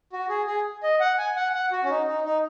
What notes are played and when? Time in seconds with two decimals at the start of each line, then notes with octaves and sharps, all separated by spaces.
0.13 F#4
0.29 G#4
0.47 G#4
0.83 D#5
1.00 F#5
1.18 G#5
1.36 F#5
1.54 F#5
1.72 F#4
1.84 C#4
1.90 D#4
2.07 D#4
2.25 D#4